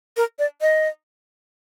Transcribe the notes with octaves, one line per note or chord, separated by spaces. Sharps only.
A#4
D5
D#5